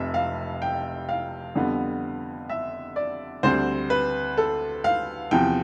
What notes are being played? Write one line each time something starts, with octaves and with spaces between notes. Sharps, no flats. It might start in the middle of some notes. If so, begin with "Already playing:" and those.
Already playing: F1 F2 C3 E5
F5
G5
F5
F2 D3 G3 B3
E5
D5
D2 D3 G3 C4 C5
B4
A4
F5
E2 C3 F3 G5